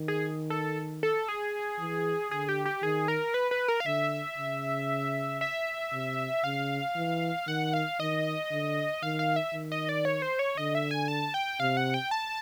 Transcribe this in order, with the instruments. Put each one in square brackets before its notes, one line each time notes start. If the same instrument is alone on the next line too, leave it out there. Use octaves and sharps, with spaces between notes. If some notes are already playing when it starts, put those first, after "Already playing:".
Already playing: [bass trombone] D#3
[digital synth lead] G#4
A4
A4
G#4
[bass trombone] E3
[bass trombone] D3 [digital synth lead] G#4
[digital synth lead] G4
G4
[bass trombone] D#3 [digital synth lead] G#4
[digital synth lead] A#4
B4
B4
A#4
F5
[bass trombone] D3 [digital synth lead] E5
[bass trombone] C#3
[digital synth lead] E5
[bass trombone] C3
[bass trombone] C#3 [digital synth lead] F5
[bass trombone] E3
[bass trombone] D#3 [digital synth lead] F#5
[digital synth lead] F5
[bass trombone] D#3 [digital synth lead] D#5
[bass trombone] D3
[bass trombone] D#3 [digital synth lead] F5
[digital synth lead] F5
E5
[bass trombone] D#3
[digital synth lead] D#5
D5
C#5
C5
C#5
[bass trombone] D3 [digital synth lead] D#5
[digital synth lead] E5
G#5
A5
G5
[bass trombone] C3 [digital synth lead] F5
[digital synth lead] F#5
G5
A5